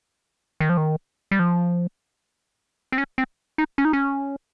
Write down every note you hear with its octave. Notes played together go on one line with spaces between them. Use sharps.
D#3
F3
D#3
G3
F3
C4
C#4
C4
D#4
C#4
D#4
C#4